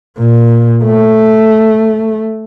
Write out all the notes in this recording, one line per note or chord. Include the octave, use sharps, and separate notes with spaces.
A#2
A3